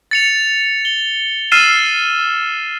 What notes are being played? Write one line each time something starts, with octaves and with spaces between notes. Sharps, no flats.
A6 C#7 F7
G7
E6 F6 A6 C7 D#7 E7